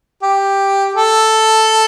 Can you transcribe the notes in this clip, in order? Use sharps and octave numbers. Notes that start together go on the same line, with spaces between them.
G4
A4